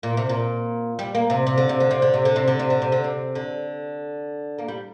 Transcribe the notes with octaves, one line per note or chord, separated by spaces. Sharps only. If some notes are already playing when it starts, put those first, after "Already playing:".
A#2
C3
A#2
G3
A#3
C3
C3
D3
C3
D3
C3
D3
C3
D3
C3
D3
C3
D3
C3
D3
C3
D3
A#3
G3